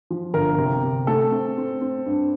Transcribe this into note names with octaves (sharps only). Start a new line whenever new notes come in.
F3
G1 A#4
C3
C3
A3 A4
C4
C4
C4
G2